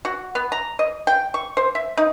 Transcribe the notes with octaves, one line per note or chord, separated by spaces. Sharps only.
F#4
B3
A#5
D#5
G5
C#6
C5
E5
D#4